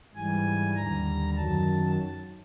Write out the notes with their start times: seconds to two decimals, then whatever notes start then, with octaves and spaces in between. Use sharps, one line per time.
0.15 G#2 E3 G3 G#5
0.76 D#2 D3 G3 A#5
1.36 F#2 D#3 F#3 A5